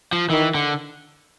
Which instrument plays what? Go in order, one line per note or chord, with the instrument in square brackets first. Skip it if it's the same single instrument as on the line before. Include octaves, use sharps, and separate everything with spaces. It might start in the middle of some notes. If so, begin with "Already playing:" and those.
[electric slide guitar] F3
[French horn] D#3 [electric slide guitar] E3
[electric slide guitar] D3